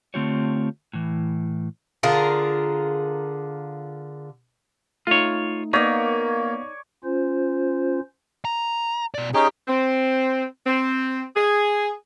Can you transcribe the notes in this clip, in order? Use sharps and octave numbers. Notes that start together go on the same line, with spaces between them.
D3 A3 C4 F4 G4 C#5
A2 E3
D3 F4 G#4 A#4
A3 D#4 F4 C#5
A#3 B3 D#4 C#5 D5 F5 B6
C#4 F4 C5
A#5
B2 D5
C#4 D#4 G4 G#4
C4
C4
G#4